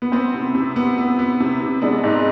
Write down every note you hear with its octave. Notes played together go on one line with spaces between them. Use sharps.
B3
B3 C4
C3
C3
B3
B3
B3
C3
C3
G#3 B3 D4
G#2